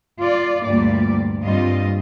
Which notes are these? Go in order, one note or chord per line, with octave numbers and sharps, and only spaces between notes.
F4 D5
D2 G2 A#2 G3 A#3 D5
G2 G3 C4 F4 D#5